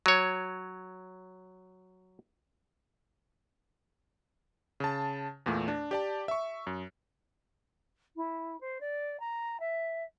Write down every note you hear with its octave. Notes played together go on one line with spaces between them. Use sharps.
F#3 C#5
C#3 A5
E2 A#2 A3
D4
G4 D5 A5
E5 C#6
F#2
E4
C5
D5
A#5
E5